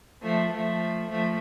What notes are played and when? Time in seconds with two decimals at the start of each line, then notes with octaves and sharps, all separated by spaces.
0.23 F3 A3
0.52 F3 A3
1.10 F3 A3